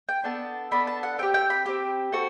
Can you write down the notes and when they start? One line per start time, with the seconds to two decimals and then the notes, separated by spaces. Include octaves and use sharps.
0.09 G5
0.24 B3 D4 A4 A5
0.71 B3 D4 A4 B5
0.87 A5
1.03 F#5
1.18 C4 G4 G5
1.34 G5
1.50 B5
1.66 C4 G4
2.12 C4 F#4 A4